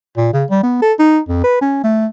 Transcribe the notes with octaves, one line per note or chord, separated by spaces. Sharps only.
A#2
C#3
G3
B3
A4
D#4
F2
B4
C#4
A3